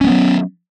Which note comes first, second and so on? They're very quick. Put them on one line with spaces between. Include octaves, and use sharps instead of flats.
C#4 G#3 B3 F#3